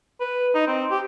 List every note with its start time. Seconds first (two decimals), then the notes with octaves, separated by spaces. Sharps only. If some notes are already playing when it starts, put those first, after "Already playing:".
0.20 B4
0.55 D#4
0.67 C4
0.91 G4